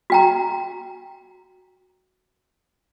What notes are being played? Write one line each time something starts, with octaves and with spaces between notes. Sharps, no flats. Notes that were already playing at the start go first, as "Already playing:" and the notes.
F#4 G5 A#5